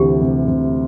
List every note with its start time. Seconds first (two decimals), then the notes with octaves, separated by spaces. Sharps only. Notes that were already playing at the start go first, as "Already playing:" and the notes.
Already playing: D2 C3 E3 G4
0.21 C3
0.48 C3